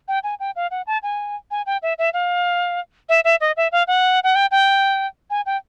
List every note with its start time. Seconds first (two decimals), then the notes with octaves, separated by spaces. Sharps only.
0.08 G5
0.24 G#5
0.40 G5
0.56 F5
0.71 F#5
0.87 A5
1.03 G#5
1.51 G#5
1.66 G5
1.82 E5
1.98 E5
2.14 F5
3.09 E5
3.25 E5
3.41 D#5
3.57 E5
3.72 F5
3.87 F#5
4.24 F#5
4.35 G5
4.51 G5
5.30 G#5
5.46 G5